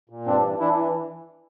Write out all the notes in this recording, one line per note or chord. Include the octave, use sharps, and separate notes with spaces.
A#2
G2 C4 D4
E3
E3 D4 E4